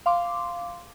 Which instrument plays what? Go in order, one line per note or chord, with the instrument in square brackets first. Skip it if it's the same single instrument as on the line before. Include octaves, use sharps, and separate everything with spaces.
[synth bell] F5 C6 D6